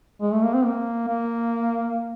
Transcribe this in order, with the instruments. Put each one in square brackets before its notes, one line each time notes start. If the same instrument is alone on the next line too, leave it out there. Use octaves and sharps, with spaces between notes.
[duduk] G#3
A3
A#3
C4
A#3
A#3